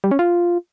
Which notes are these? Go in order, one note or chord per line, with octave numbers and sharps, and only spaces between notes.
G3
C#4
F4